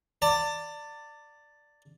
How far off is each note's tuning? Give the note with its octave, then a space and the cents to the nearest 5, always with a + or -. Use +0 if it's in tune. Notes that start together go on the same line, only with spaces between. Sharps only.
D5 +0 A5 +40